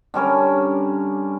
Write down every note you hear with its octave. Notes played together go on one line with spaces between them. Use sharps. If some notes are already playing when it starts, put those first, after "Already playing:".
D3 G3 C#4 A#4